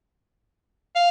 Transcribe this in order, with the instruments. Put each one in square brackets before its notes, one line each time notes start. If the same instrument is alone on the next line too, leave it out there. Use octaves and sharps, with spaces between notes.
[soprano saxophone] F5